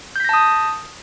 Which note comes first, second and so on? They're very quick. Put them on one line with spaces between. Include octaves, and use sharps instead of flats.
G6 B6 A#6 A5 D#6